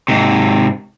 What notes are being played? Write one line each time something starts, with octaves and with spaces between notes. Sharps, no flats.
G#2 C3